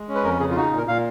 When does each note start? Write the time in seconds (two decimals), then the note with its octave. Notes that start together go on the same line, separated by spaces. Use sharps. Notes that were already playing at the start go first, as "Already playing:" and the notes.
Already playing: G#3
0.08 C#4
0.15 B4
0.24 F2 A#4
0.40 C#3 G#4
0.51 F4
0.56 D#4 F#4
0.72 A#2
0.78 A#4
0.88 A#2 F5